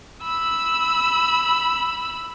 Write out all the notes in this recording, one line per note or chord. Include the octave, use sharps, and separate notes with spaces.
B5 E6